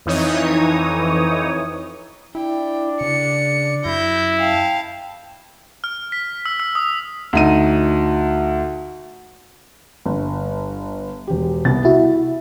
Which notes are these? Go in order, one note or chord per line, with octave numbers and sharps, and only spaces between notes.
F2 E3 D#4 C#5 D#6
D4 E4 G5
C#3 C#7
F#2 E4 G6 A#6
F5 G5 A5
F6
B6
E6
E6
D#6
D2 D#4 D#7
G1
E1 G4
C2 C3 B3 A6
E4 F#4 E5